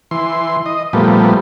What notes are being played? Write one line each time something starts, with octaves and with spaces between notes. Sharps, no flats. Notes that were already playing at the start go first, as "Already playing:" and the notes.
E3 C6
D#5
A#2 F3 G3 A3 B3